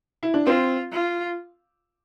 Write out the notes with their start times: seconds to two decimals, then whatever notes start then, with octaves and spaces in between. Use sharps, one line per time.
0.23 E4
0.34 D4
0.46 C4 F4
0.92 F4